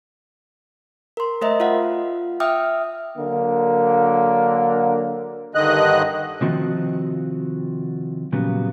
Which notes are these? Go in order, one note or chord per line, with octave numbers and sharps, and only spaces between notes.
A#4 C6
A3 A#4 C5 D#5 E5 A#5
F4 F5 F#5
E5 G5 D6 D#6 F6
D3 F#3 A#3
G2 D3 D#3 D#5 F#6
C3 D#3 F3 C4 F4 F#4
A#2 C#3 F#3 G3 B3